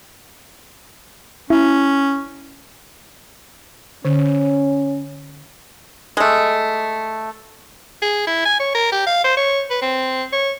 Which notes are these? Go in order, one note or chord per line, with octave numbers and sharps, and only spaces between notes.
C#4 E4
D3 C#4
G#3 A3
G#4
E4
G#5
C#5
A#4
G4
F5
C5
C#5
B4
C4
C#5